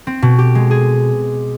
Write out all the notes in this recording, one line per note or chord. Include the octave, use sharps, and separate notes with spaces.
C4
B2
G4
G#3
G#4